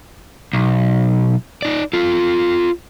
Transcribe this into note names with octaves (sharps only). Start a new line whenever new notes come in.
B1
D#4 D5
F4 A4